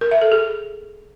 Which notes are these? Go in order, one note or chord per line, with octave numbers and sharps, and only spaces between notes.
A#4
E5
A4
G#4